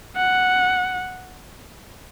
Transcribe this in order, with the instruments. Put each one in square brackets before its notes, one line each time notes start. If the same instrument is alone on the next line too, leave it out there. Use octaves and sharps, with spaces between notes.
[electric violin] F#5